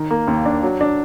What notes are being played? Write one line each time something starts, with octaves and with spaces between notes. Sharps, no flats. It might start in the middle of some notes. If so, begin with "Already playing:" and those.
Already playing: D#3
A#3
D#2
D4
F#3
D4